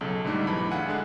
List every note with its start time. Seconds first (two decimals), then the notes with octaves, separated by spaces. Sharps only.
0.01 B1 C#3 A4
0.25 G#2 D3 G3 A3 D#4
0.47 B1 E3 B5 D6
0.71 D4 F4 G#4 E5 F#5 G#5
0.88 D3 G#3 F#6